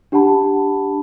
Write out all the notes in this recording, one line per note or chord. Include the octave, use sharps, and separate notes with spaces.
D4 G4 F#5 A5 B5